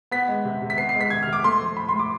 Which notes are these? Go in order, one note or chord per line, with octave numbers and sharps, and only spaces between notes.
B3 B6
G#3
C3
C3
B6
B3 C7
C7
G#3
B6
C3 G#6
C3 F6
D6
A3 C6
F3
A2 B5
A2 C6
D6